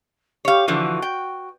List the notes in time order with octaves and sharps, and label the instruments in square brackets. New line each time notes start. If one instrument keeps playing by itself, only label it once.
[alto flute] G4 [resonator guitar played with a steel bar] C#5 F5
[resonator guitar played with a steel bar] D3 E3 F3 [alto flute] F#4
[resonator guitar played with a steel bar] G5